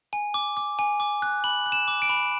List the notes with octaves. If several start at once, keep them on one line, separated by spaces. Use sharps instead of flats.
G#5
D6
D6
G#5
D6
F#6
B5 F#7
F#6
E7
D6
D7
B5